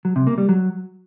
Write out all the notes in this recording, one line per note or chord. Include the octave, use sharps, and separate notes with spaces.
F#3
C3
A#3
G3
F#3